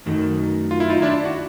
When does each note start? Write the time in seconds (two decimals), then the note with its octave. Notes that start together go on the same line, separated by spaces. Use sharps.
0.06 F#2 D#3 F#3 A3
0.71 F4
0.80 E4
0.90 D#4 F4
1.02 D4 E4
1.25 F#4